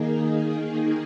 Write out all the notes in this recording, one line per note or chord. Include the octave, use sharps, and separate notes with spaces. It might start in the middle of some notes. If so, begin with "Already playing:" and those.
Already playing: D#3 A#3 D#4 G#4